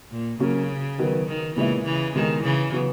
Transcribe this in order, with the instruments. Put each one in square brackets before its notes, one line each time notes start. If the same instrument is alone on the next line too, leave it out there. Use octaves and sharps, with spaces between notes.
[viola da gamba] A#2
[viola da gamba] C#3 [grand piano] F#3 A#3 C#4
[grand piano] D#3 F#3 B3
[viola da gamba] D#3
[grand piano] A#2 G#3 B3 E4 [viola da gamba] C#3 E3
[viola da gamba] C#3 E3
[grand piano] B2 G#3 D#4 G#4 [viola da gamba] D#3
[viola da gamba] C#3 E3
[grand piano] F#3 B3 F#4